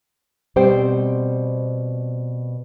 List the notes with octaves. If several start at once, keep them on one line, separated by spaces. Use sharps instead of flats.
B2 G3 C4 C5 G5